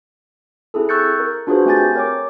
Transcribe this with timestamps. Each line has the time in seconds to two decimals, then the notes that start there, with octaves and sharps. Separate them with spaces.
0.74 C4 E4 G#4 A4
0.89 C#6 E6 F#6 G6 A6 C#7
1.20 A#4
1.47 D4 F4 F#4 G#4 B4 C5
1.65 A3 C4 G4 G#5 G6 A6
1.95 A#4 C#5 D6